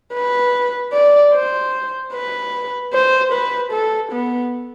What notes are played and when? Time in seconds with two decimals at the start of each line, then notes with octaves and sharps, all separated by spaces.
0.14 B4
0.93 D5
1.33 C5
2.13 B4
2.93 C5
3.32 B4
3.72 A4
4.12 B3